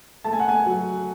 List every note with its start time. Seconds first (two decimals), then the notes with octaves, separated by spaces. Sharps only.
0.25 A3 A5
0.33 G#5
0.39 F#5
0.48 G#5
0.66 F#3